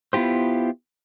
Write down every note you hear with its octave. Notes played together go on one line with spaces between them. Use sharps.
B3 E4 F4 G4 C5